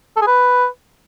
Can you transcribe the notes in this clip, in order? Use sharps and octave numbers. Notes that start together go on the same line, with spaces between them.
A4
G#4
B4